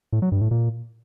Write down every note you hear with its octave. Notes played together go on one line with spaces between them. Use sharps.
A2
F#3
G2
A2
A#2